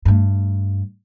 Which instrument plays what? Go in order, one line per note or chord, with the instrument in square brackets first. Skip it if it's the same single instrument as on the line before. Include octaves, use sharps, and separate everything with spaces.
[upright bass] G2 A3